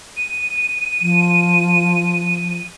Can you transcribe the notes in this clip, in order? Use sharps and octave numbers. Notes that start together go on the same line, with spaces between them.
D#7
F3